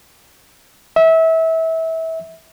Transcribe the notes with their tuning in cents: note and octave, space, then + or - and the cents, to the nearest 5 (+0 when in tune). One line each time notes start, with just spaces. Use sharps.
E5 -25